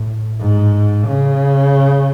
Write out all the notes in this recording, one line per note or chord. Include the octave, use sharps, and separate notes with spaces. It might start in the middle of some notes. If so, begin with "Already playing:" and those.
Already playing: A2
G#2
C#3